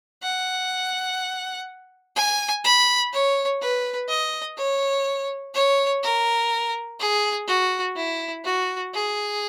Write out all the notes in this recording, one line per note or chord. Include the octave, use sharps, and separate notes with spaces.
F#5
G#5
B5
C#5
B4
D#5
C#5
C#5
A#4
G#4
F#4
E4
F#4
G#4